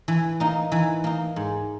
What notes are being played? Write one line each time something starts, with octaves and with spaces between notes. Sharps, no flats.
E3
A#3 D#4
E3
A#3 D#4
G#2